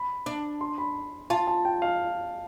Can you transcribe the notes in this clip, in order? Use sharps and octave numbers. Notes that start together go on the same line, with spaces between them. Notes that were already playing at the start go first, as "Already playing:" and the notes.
Already playing: B5
D4
C6
B5
F4 A5
A5
G5
F5